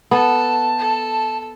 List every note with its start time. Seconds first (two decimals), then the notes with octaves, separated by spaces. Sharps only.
0.11 B3 A4 A5
0.78 A4